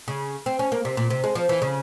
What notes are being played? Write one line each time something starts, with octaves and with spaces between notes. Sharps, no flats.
C#3
C4
C#4
A#3
C3
A#2
C3
G#3
F3
E3
C#3